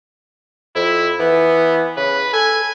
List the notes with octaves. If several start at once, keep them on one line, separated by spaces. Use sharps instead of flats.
F2 E4
E3 B3
C#3 B4
A4 G#5